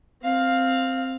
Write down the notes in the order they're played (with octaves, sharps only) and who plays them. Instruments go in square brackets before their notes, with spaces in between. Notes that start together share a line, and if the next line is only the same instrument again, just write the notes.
[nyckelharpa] C4 F5